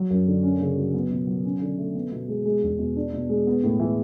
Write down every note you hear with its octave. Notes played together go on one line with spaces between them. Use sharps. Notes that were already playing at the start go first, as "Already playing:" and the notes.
Already playing: F#3
F#2
D3
C#4
C#3
F#3
B3
B2
F#3
C#4
D3
A3
B3
B2
G#3
G#3
E2
B2
D4
B2
G#3
B3
A2
E3